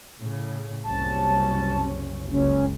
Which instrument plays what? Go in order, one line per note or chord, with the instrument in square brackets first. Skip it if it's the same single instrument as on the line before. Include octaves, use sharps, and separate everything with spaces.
[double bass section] A2 C#3
[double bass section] F#1 C2 C#4 [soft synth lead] A5
[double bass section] F#1 C#2 [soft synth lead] C#4